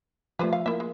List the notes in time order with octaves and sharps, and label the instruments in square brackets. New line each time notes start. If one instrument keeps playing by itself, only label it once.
[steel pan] F3 A3 [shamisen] G4 B4 C5
[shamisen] F5
[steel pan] A#3 [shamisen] E4 E5
[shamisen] G#3